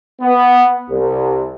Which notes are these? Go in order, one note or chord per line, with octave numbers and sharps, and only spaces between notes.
B3
C2